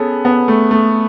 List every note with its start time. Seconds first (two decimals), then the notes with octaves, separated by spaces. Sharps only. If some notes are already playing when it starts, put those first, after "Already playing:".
Already playing: B3 C#4 G#4 A4
0.25 B3
0.48 A3
0.71 A3